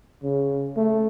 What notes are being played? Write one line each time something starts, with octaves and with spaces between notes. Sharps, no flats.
C#3
A3